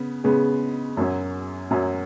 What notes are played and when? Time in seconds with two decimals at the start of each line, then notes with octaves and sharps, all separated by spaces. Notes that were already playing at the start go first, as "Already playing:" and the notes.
Already playing: C#3 B3
0.24 C#3 G#3 B3
0.97 F#2 F#3 C#4
1.71 F#2 F#3 C#4